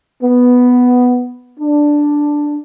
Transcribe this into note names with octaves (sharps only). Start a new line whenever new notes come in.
B3
D4